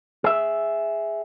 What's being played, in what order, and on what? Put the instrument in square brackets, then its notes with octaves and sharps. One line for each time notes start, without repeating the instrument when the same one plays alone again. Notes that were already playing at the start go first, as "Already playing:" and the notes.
[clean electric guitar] G#4 E5